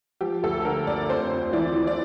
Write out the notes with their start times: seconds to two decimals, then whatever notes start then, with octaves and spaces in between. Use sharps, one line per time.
0.21 F3 G4
0.43 D2 A4
0.65 D3 A#4
0.87 D2 D5
1.09 F2 C5
1.32 F2
1.53 E3 D5
1.75 E3
1.87 D5